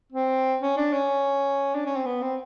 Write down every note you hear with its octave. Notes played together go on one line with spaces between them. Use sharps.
C4
C#4
D4
C#4
D4
C#4
C4
B3
C4